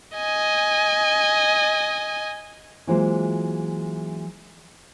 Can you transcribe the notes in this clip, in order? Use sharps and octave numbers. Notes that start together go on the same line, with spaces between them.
D#5 G#5
E3 F#3 G#3 A#3 F4 C5